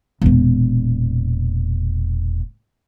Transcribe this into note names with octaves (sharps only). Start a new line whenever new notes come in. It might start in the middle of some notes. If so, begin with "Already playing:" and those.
E1 A#2